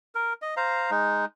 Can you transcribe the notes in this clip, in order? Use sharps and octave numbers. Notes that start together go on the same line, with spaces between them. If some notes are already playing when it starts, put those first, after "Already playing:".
A#4
D#5
C5 F5 A#5
G#3 D#4